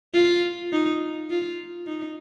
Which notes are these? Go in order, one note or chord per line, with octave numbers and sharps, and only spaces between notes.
F4
D#4
F4
D#4